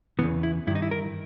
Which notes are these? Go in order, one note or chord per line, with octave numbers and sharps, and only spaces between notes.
E2 C#3 E3 B3
E4
G2 D#3 D#4 E4
E4
A#4